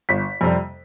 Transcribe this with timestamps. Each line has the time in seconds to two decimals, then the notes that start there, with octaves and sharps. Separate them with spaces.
0.09 G1 B6
0.41 F2 C3 G3